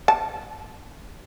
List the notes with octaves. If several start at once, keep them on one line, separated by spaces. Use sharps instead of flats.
A5